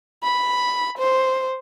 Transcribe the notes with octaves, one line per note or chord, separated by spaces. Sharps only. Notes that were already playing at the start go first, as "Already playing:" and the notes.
B5
C5